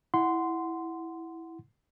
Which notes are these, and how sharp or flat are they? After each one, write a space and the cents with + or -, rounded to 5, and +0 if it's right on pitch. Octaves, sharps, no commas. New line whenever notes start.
E4 -5 F#5 +0 C6 -15